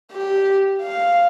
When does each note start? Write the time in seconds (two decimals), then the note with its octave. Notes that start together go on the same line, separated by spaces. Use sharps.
0.12 G4
0.81 F5